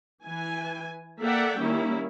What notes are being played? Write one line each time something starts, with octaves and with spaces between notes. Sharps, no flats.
E3 G#5
A#3 A4 D5 E5 F#5 G5
D#3 G3 A#3 C#4 E4